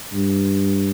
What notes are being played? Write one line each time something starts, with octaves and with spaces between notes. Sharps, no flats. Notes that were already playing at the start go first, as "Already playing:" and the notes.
G2